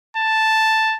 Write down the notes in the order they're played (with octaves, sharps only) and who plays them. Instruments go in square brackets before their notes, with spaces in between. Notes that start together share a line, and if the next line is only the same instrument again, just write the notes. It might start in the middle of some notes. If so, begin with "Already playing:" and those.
[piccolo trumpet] A5